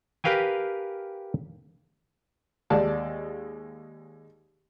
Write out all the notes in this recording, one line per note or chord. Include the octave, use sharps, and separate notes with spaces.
G4 A#4 B4 F5 G5 G#5
D#2 G#3 D5 A5